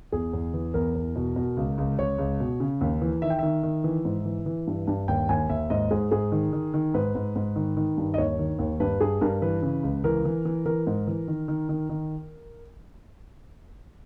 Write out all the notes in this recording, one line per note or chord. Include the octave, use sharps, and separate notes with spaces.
E2 G#4
E2
E3
E2 A#4
E2
B2
B2
C#2
C#2
C#2 C#5
C#2
B2
C#3
D#2
E3
D#3 E5
G5
D#3 E5
D#3
E3
G#2
E3
E3
G2
G2
D#2 G5
D#2 G#5
D#2 E5
G#2 D#5
G#2 G#4
G#2 G#4
D#3
D#3
D#3
G#2 B4
G#2
G#2
D#3
D#3
G2
D#5
D#2 C#5
D#3
D#2
G2 B4
G2 G#4
G2 A#4
E3 B4
C#3
C#2
E3 A#4
E3
E3
E3 A#4
G#2
E3
D#3
D#3
D#3
D#3